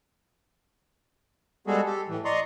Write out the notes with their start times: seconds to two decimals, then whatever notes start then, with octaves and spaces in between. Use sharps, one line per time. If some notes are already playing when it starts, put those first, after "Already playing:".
1.67 G3 G#3 B3 F#4 G#4 A4
1.86 G4 A4
2.08 A2 E3
2.25 D5 D#5 A#5 C6 C#6 D#6